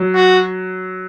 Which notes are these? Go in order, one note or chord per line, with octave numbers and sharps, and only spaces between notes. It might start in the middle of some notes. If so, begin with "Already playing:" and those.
Already playing: F#3
F#4